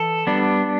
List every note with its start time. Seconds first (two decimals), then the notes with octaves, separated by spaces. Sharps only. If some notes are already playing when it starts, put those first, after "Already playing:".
Already playing: E3 A4
0.27 G3 B3 D4